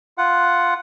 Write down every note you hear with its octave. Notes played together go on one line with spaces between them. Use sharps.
F4 F#5